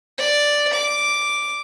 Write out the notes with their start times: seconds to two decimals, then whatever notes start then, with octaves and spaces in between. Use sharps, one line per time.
0.18 D5
0.73 D6